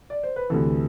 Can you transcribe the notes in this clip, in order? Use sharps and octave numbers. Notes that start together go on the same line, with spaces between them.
D5
C5
B4
D2 C3 E3 A4